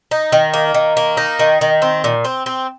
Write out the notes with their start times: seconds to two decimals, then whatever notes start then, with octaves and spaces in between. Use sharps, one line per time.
0.11 D#4
0.32 D#3
0.54 A#3
0.74 D#3
0.97 A#3
1.17 D#4
1.39 D#3
1.61 D#3
1.82 C4
2.04 A#2
2.25 C4
2.46 C4